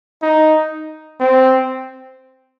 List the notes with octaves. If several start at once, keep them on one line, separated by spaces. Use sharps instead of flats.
D#4
C4